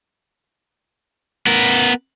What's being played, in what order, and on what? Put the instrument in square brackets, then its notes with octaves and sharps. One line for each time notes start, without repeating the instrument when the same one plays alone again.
[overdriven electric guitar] B3 A#4